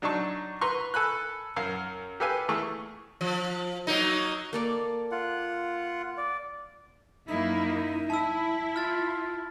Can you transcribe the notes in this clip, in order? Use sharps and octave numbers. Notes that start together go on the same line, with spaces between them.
F#3 D4 D#4 A5 C#6
B4 A#5 C6 C#6
A4 G#5 B5 F#6
F#2 F5
G4 A4 B4 F5 G#5
E2 E3 A3 G#4 C#6
F3
F#3 A#3 D#4
A#3 A4 D5
F4 F#5
D5
F#2 A#3 D#4 E4
E4 A5 E6
F4 F6 A6